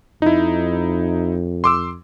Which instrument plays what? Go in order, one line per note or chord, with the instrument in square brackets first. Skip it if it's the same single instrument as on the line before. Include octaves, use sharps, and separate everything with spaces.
[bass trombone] F2 [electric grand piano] D#4 E4
[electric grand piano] C6 D6 E6